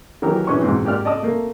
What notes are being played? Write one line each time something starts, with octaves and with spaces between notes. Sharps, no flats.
D#3 E3 F#3 G4 A#4
A#1 E3 C#4 D4 B4 C#6
E2 G#2 B2 C4
G#2 G4 A#4 D5 F6
D5 D#5 A5 D#6
A3 A#3